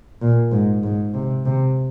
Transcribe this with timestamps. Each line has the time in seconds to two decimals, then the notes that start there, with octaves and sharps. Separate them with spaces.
0.22 A#2
0.52 G#2
0.83 G#2
1.14 C3
1.46 C3